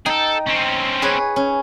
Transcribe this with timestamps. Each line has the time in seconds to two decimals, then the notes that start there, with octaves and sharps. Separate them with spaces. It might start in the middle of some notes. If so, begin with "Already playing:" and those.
0.06 D#4 G#4 A4 G5
0.47 C4 C#4
1.02 G#4 B4 C#5
1.36 C#4